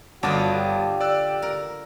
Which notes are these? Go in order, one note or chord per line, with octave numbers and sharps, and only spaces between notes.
G1 D3 F4 F#4 D#5 A5 D6
G4
D5 E6 F#6
A#4